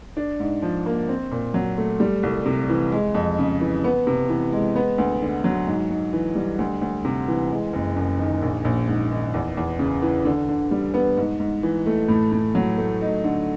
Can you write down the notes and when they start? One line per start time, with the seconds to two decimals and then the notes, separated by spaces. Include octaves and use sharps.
0.17 D4
0.40 G#2
0.62 F3
0.86 A#3
1.09 C4
1.31 A#2
1.54 F#3
1.78 A3
2.00 G3
2.23 C2
2.46 C3
2.69 E3
2.92 G#3
3.14 F2
3.38 C#3
3.61 E3
3.84 B3
4.07 C3
4.29 E3
4.52 G#3
4.76 B3
4.98 D2
5.21 D3
5.44 F#3
5.67 G#2
5.90 G#2
6.13 E3
6.35 G3
6.59 D2
6.81 D2
7.05 C3
7.28 E3
7.51 G#3
7.73 F#1
7.96 F#2
8.19 D#3
8.42 A#1
8.65 A#1
8.88 G#2
9.11 D#3
9.34 E2
9.57 E2
9.79 C#3
10.02 E3
10.25 D3
10.49 D3
10.71 G3
10.94 B3
11.17 G#2
11.40 G#2
11.63 E3
11.86 A3
12.08 A2
12.32 A2
12.55 F#3
12.78 A3
13.01 D#4
13.24 D3